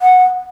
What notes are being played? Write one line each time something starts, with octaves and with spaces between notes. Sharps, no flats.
F#5